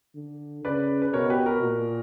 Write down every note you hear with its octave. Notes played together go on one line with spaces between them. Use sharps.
D3
C#3 B4 D5
B4
B2 A#4 C#5
G4 B4
F#4 A#4
A#2